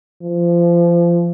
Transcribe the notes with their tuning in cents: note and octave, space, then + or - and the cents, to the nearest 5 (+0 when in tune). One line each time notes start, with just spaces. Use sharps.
F3 -25